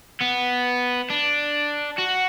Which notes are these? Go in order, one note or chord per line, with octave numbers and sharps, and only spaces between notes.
B3
D4
F#4